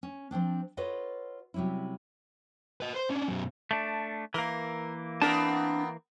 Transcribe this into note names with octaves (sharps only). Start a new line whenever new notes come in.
C#4
F3 A#3 C4 D4
F4 A4 B4 C#5 D#5 F#5
C3 F#3 G3 C#4 E4
B4 D#5
C5
C#4 D4
F#2 B2
A3 D4
E3 A#3 A#4
B3 C4 D4 A#4 A5